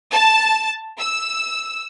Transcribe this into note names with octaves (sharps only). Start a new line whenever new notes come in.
A5
E6